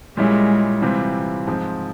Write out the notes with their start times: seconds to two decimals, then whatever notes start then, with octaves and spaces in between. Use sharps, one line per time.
0.17 A#2 G3 G#3 C#4 E4
0.82 C3 E3 G3 C4 F4
1.47 G#2 F3 C4